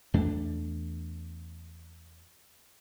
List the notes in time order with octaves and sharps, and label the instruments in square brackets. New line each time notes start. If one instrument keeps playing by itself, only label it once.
[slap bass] E2 A3 D4